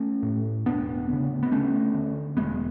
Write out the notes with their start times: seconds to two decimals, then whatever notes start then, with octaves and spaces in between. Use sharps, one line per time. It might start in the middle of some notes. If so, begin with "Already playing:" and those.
Already playing: A3 C#4
0.23 A2
0.66 E1 B3 D4
1.09 D2 C#3
1.43 B3
1.51 D2 A3 C#4
1.94 D3
2.37 E1 G#3 B3